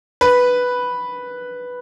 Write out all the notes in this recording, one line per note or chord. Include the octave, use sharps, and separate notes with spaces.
B4